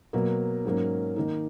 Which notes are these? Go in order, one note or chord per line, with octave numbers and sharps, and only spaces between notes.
B2 F#3 A#3
G#2 F#3 A#3 C#4
D#3 A#3 D#4